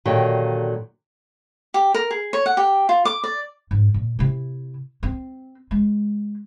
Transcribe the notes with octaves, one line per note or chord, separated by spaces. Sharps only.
A#2 D3 D#3 F#3 F4 G4
G4
A#4
G#4
C#5
F#5
G4
F4
D6
D5
G#2
A#2
C3 E4
C4
G#3